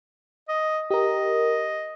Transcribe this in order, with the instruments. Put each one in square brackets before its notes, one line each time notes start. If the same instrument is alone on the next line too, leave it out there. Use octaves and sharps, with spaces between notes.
[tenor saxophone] D#5
[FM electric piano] G4 A#4 [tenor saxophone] D#5